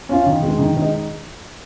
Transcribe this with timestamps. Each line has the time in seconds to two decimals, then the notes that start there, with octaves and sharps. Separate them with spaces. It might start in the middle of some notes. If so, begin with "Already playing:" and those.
0.09 C#4 F4
0.26 D#3
0.42 G#3 D#4
0.58 D#3
0.76 G#3 D#4